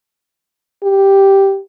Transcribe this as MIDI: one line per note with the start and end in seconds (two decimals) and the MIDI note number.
0.83 1.59 67